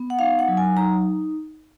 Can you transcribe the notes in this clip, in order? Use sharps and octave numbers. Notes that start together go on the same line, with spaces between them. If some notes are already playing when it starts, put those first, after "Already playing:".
Already playing: B3
F#5
D#4 F5
F#5
F#3
G#5
D#4 A#5